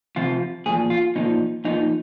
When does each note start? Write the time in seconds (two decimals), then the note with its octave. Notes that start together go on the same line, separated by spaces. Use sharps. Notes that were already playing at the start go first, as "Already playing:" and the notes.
0.16 C3 F3 F4
0.66 A#2 F3 G#4
0.90 F4
1.16 A#2 F3 D#4
1.65 A#2 F3 D#4